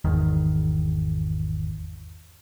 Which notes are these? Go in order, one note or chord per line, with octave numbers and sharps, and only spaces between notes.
G#1 E2 D#3